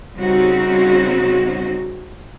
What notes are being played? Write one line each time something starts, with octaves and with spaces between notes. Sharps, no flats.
C#3 G3 C4 C#4 D#4 F#4